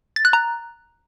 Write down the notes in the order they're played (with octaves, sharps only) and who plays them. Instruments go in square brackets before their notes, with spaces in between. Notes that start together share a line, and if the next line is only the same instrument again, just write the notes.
[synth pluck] A6
F#6
A#5